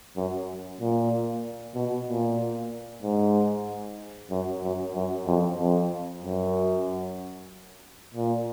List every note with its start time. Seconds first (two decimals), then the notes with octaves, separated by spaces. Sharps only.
0.17 F#2
0.81 A#2
1.75 B2
2.08 A#2
3.03 G#2
4.31 F#2
4.62 F#2
4.95 F#2
5.27 F2
5.58 F2
6.22 F#2
8.14 A#2